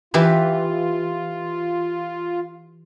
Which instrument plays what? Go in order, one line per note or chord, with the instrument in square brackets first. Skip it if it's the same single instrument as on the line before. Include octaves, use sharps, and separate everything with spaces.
[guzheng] E3 G4 B4 [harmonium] F4